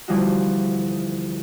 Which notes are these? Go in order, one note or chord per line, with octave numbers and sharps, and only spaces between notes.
D2 E3 F3 G3 D#4 F#4